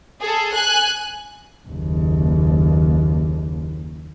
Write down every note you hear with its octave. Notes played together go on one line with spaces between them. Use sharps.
G#4 A4
G#5 F#6
F#1 D#2